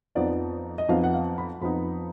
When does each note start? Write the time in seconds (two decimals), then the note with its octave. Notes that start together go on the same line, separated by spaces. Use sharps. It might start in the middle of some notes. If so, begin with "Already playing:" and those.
0.15 F2 F3 B3 D#4 D5
0.78 D#5
0.88 F2 F3 B3 D#4 F5
1.04 F#5
1.14 F5
1.38 B5
1.61 F2 F3 B3 D#4 B5